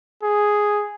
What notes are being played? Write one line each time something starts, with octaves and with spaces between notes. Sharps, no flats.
G#4